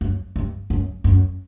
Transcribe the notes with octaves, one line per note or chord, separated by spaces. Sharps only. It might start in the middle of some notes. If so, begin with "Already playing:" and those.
F#2
G2
F#2
F#2